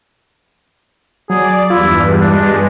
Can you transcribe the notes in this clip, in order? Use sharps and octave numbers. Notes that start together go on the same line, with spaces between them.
F#3 G#4 D5
E2 G2 E4 F4
G2 G#3 D4